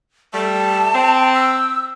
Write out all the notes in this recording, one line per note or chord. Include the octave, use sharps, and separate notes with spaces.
G3 A3 A5
C4
E6